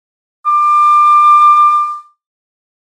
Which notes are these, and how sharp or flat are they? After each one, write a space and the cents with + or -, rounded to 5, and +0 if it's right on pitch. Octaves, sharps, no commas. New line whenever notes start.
D6 +25